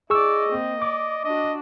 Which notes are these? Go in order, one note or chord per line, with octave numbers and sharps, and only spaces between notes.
E4 G#4 D5 D#5 C#6 E6
A#3 C4
D5 D6
D4 F#4 D#5